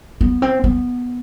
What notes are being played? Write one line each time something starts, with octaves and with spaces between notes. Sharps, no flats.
B3
C4
B3